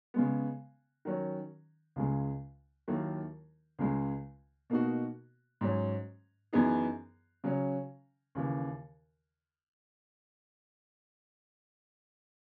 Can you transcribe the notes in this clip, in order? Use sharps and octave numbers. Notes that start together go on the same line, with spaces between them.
C#3 G#3 B3
D#3 F#3 C#4
C#2 C#3 G#3
D#2 D#3 F#3 A#3 E4
C#2 C#3 G#3
B2 A#3 D#4 F#4
G#2 F#3 C#4
F#2 E3 B3 D#4 G#4
C#3 F#3 C#4
D#2 C#3 E3